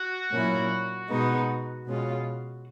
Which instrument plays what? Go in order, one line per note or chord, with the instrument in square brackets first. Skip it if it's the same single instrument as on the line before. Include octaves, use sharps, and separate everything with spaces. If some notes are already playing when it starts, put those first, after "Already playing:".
Already playing: [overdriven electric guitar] F#4
[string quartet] A#2 F#3 A#3 C#4 E4
B2 G#3 B3 D#4
B2 G#3 C#4 F4